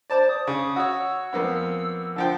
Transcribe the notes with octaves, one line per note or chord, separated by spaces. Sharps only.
C5 D5 A5 D6
D#6
C#3
F#4 C#5 E6
F2 A#3 B3
D3 F3 G5